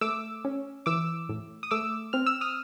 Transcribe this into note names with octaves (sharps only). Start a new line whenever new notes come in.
A3 D6 E6
C#4
E3 D6 E6
A2
D#6
A3 D6 E6
C4 F6
E6
D#6 F6